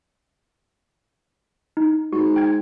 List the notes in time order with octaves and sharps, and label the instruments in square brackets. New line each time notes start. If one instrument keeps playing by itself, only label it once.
[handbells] D#4
[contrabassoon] G#2 [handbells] F#4
[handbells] G5 G#6